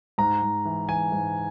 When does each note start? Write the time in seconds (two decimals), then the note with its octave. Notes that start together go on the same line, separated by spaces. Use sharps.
0.18 G#2 A#5
0.42 G#2
0.65 E3
0.88 E3 G#5
1.12 G#2